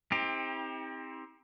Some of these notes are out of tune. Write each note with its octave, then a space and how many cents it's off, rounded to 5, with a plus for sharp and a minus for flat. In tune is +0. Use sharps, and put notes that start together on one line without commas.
C4 +5 D#4 +40 G4 +30